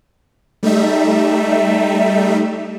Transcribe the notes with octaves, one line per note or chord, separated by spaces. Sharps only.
G3 A3 D#4 E5